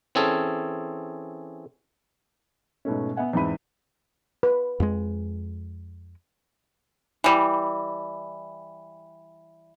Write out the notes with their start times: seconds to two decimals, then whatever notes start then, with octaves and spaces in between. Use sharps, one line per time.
0.15 E3 C4 C#4 G#4 A4
2.85 G#2 B2 A3 C#4
3.16 B3 E5 F#5 G#5
3.33 E2 G#2 C4 E5 B5 D#7
4.43 B4
4.80 F2 G#3
7.24 E3 G3